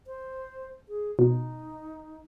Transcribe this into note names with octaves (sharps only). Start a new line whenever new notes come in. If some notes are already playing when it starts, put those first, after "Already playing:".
C5
G#4
B2 D#4